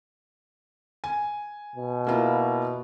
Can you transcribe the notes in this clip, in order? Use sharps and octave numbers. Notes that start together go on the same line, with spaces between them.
G#5
B2
A#3 E4 F4